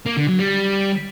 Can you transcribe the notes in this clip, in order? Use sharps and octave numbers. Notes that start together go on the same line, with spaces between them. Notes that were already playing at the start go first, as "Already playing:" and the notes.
A#3
D3
F#3
G3